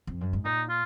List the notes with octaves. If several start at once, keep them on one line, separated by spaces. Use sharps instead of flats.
F2
F#2
G#2
A#2 D#4
F4